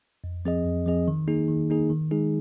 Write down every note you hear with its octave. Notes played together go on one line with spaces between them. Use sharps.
F2
F3 C4 G#4 D#5
F2
F3 C4 G#4 D#5
D#3
A#3 D#4 G#4
D#3
A#3 D#4 G#4
D#3
G#3 D#4 G#4